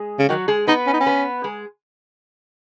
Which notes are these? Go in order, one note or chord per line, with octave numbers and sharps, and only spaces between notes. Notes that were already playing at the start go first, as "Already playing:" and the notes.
Already playing: G#3 G#4
C#3
D#3 F#3 F#4
G#3 G#4
B3 D#4 B4
C#4
D#4
C#4
B3 B4
G#3 G#4